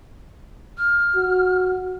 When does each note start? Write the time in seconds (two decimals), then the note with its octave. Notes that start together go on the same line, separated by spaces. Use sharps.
0.78 F6
1.16 F#4